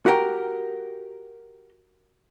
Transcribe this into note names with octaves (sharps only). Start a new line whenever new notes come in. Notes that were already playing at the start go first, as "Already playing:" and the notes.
F#4 G4 A#4 G5